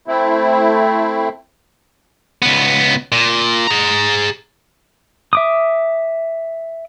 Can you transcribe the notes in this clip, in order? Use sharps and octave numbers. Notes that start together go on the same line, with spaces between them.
A3 C4 E4
C#2 B3
A#2
G#4 A#5
E5 D6 D#6